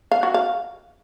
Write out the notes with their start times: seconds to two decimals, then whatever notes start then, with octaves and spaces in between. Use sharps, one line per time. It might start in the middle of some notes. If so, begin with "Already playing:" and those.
0.11 F5
0.23 F#4
0.34 F5